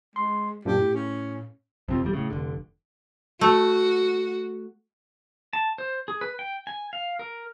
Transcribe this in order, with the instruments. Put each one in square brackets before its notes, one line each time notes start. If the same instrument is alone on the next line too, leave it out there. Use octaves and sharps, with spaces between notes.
[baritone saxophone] G#3 [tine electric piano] C6
[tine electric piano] F#2 A#2 D4 [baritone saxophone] G4
[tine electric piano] A2
[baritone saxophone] C#4
[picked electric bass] F2 C3 F3
F1 E2 G3
A2 C#3
F1 D3
[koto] A3 [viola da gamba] F#4
[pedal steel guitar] A5
C5
G#4
B4
G5
G#5
F5
A#4